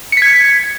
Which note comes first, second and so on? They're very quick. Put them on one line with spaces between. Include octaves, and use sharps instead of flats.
C#7 B6 G#6